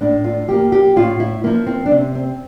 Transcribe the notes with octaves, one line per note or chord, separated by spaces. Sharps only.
A2 D4
F4
F3 A#3 G4
G4
A2 F4
E4
F3 A#3 E4
C4
D4
C3 C4
C4